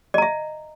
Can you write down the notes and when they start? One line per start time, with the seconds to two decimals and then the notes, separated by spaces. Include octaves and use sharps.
0.14 D#5
0.18 A#5
0.22 E5